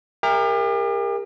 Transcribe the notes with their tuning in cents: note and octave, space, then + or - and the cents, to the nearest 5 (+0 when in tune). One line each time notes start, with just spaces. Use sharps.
G4 +40 A#4 +0 E5 +0